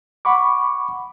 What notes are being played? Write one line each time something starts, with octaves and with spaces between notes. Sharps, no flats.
F#5 B5 C#6 D6